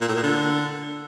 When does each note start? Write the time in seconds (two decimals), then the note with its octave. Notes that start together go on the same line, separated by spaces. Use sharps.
0.01 A#2
0.09 A2
0.16 A#2
0.23 D3